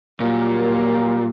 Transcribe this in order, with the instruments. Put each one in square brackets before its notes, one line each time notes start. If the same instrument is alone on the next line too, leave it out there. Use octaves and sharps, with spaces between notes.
[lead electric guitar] A#2 [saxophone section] F#3 G3 A#3